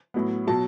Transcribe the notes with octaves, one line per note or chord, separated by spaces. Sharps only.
A2 F#3 B3
B2 F#3 A5